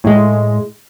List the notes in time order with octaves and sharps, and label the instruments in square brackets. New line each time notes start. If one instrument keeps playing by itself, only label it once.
[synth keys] A2 G#3